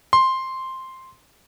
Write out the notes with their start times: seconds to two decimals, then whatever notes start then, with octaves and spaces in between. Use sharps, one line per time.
0.13 C6